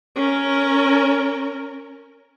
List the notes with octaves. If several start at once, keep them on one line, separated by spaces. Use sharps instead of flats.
C#4 A#4